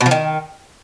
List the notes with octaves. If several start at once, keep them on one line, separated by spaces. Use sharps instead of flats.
B2
F3
D#3